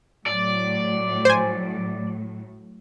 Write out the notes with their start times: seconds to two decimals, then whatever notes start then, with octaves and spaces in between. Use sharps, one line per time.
0.26 A2 F#3 D5
1.25 C5 G#5